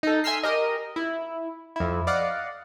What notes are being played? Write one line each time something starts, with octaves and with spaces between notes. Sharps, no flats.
D#4 A4
E5 G#5 C6 E6 F6 C7
G4 A#4 D#5
E4
F2 E4
D5 D#5 F5 F#5